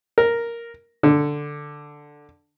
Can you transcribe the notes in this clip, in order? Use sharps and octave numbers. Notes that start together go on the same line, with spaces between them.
A#4
D3